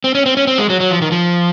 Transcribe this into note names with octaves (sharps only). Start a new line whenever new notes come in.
C4
C#4
C4
C#4
C4
G#3
F#3
F#3
F3
D#3
F3